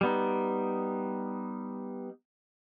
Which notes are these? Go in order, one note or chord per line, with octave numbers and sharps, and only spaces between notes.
G3 B3 D#4